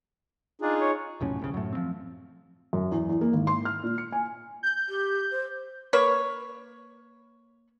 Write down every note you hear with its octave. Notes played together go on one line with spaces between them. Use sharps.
D4 D#4 F4 G#4
C#5
F1 B1 A2 C#4
G1 C2 C#3
F#2 A2
F3 C4
F#2
E2
E2
A#3
G#1
C6
F6
A#2
C#7
G#5
G6
G4
C5
A#3 B4 C#5